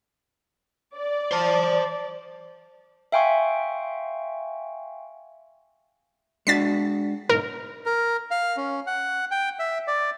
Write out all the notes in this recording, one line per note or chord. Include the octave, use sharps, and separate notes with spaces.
D5
C5 A5
E5 F5 G5 G#5 C6 C#6
G#3 D4 F#4 A6 B6 C7
B1 G#2 A#4
A#4
F5
C#4
F#5
G5
E5
D5